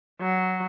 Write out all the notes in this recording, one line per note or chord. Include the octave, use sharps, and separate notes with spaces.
F#3